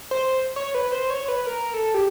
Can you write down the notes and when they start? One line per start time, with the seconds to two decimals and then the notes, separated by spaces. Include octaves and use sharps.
0.11 C5
0.56 C#5
0.75 B4
0.92 C5
1.10 C#5
1.28 B4
1.46 A#4
1.74 A4
1.94 G4